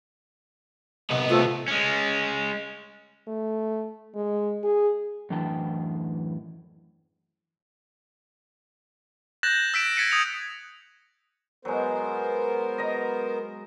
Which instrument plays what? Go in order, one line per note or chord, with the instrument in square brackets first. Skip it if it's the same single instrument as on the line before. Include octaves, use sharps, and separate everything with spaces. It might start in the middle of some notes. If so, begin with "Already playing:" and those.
[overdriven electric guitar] C2 B3 [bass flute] D#5
[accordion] A3 C4 A4 [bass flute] F4
[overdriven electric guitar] G#3 C#4
[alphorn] A3
G#3
G#4
[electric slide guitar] F#2 A2 E3 D4 G5 A5
[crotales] F#6 G6 A6 A#6 E7 F#7
E6 B6 D7 E7
G#6 A6 B6 C#7 D#7
D#6 G#6 C#7 D#7 F7
[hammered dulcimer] F#3 G#3 [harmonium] B3 A#4 C5
[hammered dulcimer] D#5 A#5